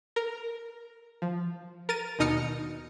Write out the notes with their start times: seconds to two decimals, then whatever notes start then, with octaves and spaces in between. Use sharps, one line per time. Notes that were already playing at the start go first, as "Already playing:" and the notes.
0.16 A#4
1.22 F3
1.89 A#4 A6 D#7
2.19 D#2 B2 D#4 D#6 F6 C#7